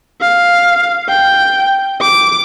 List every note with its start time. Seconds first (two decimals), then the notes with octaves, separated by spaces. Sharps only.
0.22 F5
1.09 G5
2.01 D6